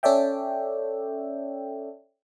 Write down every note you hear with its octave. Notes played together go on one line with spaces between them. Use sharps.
C#4 A4 C#5 D5 E5 G5